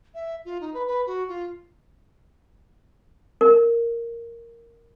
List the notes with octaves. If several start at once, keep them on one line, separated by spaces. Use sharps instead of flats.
E5
F4
D#4
B4
B4
F#4
F4
A#4